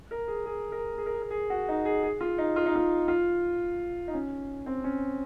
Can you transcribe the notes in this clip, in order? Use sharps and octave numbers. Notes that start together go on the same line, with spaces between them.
A#4
G#4
G#4
A#4
G#4
A#4
G#4
A#4
G#4
F#4
D#4
G#4
G#4
F4
D#4
F4
D#4
F4
F4
D#4
C#4
C4
C#4